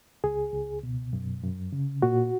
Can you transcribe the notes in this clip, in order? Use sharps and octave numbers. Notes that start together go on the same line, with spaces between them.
C#2 G#4
C#2
B2
F#2
F#2
C#3
A#2 F#4